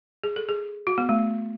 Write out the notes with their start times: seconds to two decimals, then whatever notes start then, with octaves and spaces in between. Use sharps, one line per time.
0.24 G#4
0.36 A4
0.49 G#4
0.87 F#4
0.98 B3
1.09 A3